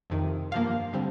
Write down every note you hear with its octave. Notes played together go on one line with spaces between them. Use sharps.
F2 C3 D#3
G2 F3 A#3 F5
D3 G3 C4